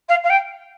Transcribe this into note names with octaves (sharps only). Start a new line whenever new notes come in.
F5
F5
G5